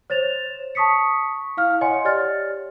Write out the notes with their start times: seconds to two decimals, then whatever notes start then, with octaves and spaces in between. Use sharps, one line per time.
0.10 C5 C#5 A6 E7 F7
0.75 A5 C#6 D#6 B6 C#7
1.57 E4 F5 F6
1.81 C#5 D#5 F#5 G#5 C6 C#7
2.05 G4 C#5 D5 F6 A6